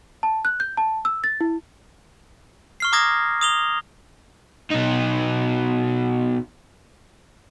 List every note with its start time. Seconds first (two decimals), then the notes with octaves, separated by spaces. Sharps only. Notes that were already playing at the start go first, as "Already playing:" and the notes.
0.23 A5
0.45 F#6
0.60 G6
0.77 A5
1.05 E6
1.24 A6
1.41 E4
2.80 C#6 F6 C7
2.92 A#5 D6 D#6 G#6 A#6
3.41 D#6 F7 G7
4.71 B2 D#4